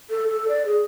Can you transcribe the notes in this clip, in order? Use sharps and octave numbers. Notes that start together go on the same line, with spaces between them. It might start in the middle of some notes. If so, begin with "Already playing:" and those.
A4
A4
D5
G#4